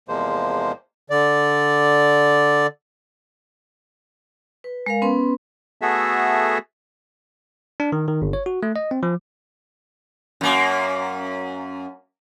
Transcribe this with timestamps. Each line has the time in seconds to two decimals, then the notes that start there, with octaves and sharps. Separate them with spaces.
0.09 E2 C3 F3 G#3 A#3 C5
1.10 D3 D5
4.64 B4
4.86 G#3 A#4 F5
5.02 B3 C#4 B4 C6
5.81 A3 B3 F#4 G#4 A4 E5
7.80 D4
7.92 D#3
8.08 D#3
8.22 G1
8.33 C#5
8.46 F#4
8.63 A3
8.76 D#5
8.91 C4
9.03 F3
10.41 F#2 A#3